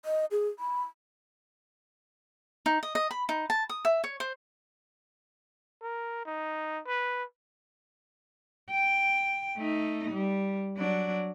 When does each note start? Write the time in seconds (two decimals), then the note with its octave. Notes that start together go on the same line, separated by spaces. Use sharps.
0.05 D#5
0.31 G#4
0.59 B5
2.66 D#4
2.83 D#5
2.95 D#5
3.11 B5
3.29 D#4
3.50 A5
3.69 D#6
3.85 E5
4.04 C#5
4.20 C5
5.82 A#4
6.26 D#4
6.87 B4
8.71 G5
9.57 A3 D#4
10.11 G3
10.77 F#3 D4